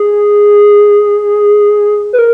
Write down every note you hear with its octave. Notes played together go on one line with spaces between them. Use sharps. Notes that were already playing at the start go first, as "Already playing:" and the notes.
Already playing: G#4
B4
A#4